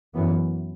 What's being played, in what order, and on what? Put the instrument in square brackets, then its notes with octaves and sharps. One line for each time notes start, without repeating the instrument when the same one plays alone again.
[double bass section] F#2 E3 B3